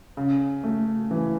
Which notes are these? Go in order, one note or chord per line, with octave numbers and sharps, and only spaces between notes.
C#3
A3
E3